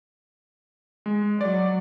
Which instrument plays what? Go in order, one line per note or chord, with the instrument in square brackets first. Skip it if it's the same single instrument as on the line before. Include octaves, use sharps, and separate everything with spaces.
[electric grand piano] G#3
[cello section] F#3 [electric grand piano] D5